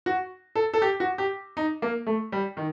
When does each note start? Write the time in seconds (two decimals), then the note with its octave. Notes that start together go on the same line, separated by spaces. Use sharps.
0.06 F#4
0.55 A4
0.74 A4
0.82 G4
1.00 F#4
1.18 G4
1.57 D#4
1.82 A#3
2.07 A3
2.32 G3
2.57 D#3